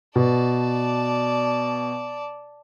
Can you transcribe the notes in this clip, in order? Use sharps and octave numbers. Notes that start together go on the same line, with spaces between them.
B2 D5 A5